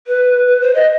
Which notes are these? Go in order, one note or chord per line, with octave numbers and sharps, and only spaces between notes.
B4
B4
C5
D#5